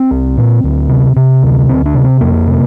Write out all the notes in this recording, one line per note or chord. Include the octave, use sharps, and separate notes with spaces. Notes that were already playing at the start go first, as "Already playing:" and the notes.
Already playing: C4
C2
A#2
D2
C3
C3
D2
D2 C4
D4
C3
C4
F2 A#3
C3